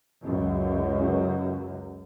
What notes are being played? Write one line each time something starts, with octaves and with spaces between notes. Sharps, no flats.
C#2 F#2